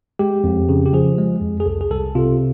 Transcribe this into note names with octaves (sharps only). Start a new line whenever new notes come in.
G#3 G4
F2
C#3
G4
F3 G#4
G#3
F2
G#4
C2 A4
G#4
C2 A4
C3 F4